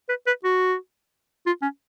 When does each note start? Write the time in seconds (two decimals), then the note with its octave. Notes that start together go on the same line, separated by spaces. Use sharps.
0.09 B4
0.27 B4
0.44 F#4
1.46 F4
1.62 C#4